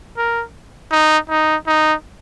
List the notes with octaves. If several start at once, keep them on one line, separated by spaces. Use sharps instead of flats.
A#4
D#4
D#4
D#4